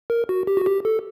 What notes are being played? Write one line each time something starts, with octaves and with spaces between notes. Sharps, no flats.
A#4
F#4
G4
F#4
G4
A4